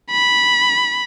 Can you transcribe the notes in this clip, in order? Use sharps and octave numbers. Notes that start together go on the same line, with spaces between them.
B5